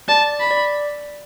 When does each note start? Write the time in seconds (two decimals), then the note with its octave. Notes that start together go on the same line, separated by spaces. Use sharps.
0.08 D5 A5
0.40 B5
0.51 D5